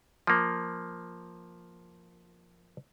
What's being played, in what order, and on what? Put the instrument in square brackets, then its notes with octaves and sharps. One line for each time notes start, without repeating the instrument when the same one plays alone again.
[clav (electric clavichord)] F3 A#3